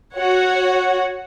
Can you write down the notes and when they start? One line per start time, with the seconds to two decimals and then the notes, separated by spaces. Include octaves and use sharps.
0.16 F#4 C#5 F#5